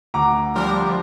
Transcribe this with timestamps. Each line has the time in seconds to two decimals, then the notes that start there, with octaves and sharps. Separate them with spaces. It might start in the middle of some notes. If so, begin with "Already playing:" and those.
0.14 D2 F#5 A#5 D6
0.55 F3 G3 D4 A#4